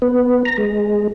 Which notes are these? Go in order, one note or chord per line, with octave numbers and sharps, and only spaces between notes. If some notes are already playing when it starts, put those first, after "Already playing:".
B3
A#5
G#3